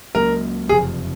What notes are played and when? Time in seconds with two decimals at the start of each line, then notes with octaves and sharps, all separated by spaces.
0.15 C#2 C#3 F#3 A#3 A#4
0.69 F#1 F2 C3 G#4